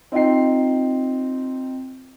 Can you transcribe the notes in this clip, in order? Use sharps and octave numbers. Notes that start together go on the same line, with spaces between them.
C4 D#4 F4 G5 C7